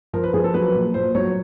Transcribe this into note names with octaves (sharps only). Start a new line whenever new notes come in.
F3 A#4
B4
F3 G#4
A4
F#3 B4
A#2
A#2 C5
F#3 C#5